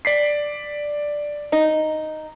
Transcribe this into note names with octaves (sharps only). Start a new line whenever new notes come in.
D5 B6 C7
D#4